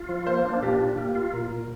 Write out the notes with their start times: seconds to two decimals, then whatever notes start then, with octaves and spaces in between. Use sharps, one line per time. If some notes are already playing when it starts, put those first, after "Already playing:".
Already playing: F4
0.09 F3
0.27 A#3 C5
0.45 D4
0.62 A#2 G4
0.80 A#2
0.97 A#3 G4
1.15 F4
1.33 A#2 A#4
1.51 A#2